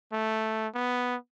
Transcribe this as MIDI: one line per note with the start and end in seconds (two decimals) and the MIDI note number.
0.12 0.68 57
0.75 1.16 59